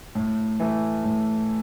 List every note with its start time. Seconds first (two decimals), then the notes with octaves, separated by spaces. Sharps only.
0.15 A2
0.60 E3 A3
1.04 A2